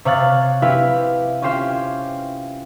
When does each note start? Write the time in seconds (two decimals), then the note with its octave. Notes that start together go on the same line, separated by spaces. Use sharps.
0.05 C3 C#5 F5 F#6 A6
0.62 C4 E4 G4 B4 F5
1.42 C#4 F4 G4 C5 F5 G5